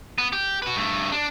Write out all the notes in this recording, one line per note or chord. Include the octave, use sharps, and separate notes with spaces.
B3
G4
F#4 B4
G2 A3
D4